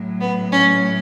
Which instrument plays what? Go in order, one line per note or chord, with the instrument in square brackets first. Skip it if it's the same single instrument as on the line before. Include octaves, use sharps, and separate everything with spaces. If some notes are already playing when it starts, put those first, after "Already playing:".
Already playing: [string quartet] A2 F#3
B3
C#4